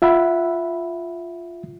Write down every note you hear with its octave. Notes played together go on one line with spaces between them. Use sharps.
F4 E5 F#5 B5